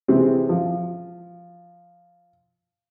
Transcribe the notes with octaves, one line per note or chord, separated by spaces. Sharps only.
C3 E3 G#3 C4
F3